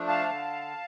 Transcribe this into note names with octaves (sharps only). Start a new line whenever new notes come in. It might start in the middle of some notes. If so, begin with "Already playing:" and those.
Already playing: F3 A3 D4
F5 A5
D3